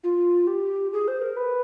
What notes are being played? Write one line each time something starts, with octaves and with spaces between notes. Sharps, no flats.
F4
G4
G#4
C5
A#4
B4